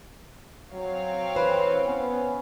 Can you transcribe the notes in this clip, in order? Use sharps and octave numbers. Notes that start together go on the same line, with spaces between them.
F#3 C4 C#5 F5
E3 B4 C5
B3 C#4